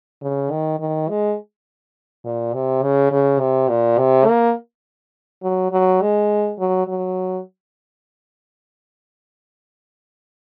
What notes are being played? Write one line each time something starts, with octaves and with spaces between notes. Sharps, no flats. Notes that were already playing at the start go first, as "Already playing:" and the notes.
C#3
D#3
D#3
G#3
A#2
C3
C#3
C#3
C3
A#2
C3
A#3
F#3
F#3
G#3
F#3
F#3